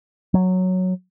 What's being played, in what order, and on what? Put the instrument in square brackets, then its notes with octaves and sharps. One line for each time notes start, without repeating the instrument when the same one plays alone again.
[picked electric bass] F#3